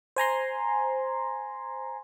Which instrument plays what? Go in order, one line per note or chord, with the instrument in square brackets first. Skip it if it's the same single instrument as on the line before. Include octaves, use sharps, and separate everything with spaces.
[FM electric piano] C5 G#5 A#5 C6